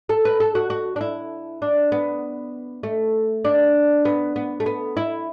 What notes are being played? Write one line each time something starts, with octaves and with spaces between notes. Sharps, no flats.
A4
B4
A4
F#4
F#4
D4
E4
D4
B3
A3
D4
B3
B3
A3
B3
E4